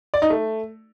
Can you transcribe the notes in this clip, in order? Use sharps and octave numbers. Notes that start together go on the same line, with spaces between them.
D5
D#4
A3